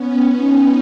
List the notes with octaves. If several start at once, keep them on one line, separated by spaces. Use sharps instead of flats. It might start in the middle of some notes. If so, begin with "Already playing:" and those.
Already playing: B3 C#4
C#4 D#4